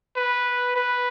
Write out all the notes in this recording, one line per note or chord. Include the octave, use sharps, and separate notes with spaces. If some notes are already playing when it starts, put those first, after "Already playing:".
B4
B4